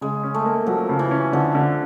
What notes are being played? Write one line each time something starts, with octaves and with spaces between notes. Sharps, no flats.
C#3 G#3
C#4
A3
A#3
F3 F#3
C#3
E3
C#4
D3 F3
D3